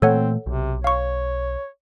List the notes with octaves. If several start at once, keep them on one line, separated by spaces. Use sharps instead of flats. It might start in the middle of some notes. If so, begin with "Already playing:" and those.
A#2 E3 A3 C4 A4 C#5 F#5
B1 C3
C#5 F5 C#6